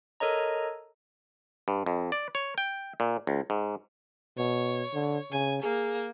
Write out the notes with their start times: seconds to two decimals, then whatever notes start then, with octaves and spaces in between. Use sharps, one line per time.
0.20 A4 A#4 C#5 D#5 A#5
1.68 G2
1.86 F2
2.12 D5
2.35 C#5
2.58 G5
3.00 A#2
3.27 C#2
3.50 G#2
4.38 B2 C#5
4.93 D3
5.31 C#3 G#5
5.63 A#3 G#4